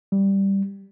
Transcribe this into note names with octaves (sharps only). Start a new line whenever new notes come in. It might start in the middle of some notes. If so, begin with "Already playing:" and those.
G3